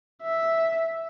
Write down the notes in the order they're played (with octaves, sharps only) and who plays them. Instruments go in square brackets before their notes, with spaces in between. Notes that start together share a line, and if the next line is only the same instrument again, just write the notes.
[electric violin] E5